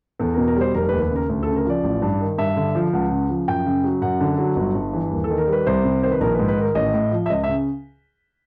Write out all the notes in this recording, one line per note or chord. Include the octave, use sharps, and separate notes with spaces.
E2 A4
B2 A#4
A#4
G3 C5
F1 A#4
B4
D#2
B4
C#3
A#4
D2
C#3 A4
A#4
F3 D5
A1
G2
D#3
G2 E5
D3
F3
C#2 F#5
C#3
F3
F#2 G5
C#3
F#3
F#2 F#5
D3
F#3
G1
G2
E3
D#2
A4
D#3
A#4
G3 B4
C2 C5
C3
D#3 C5
B4
A#1 A#4
G#2 B4
B4
D#3 A#4
A1 D#5
A2
F3
E5
C#2 D#5
E5
C#3